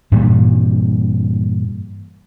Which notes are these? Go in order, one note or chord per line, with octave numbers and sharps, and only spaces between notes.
G2 A#2 E3 G3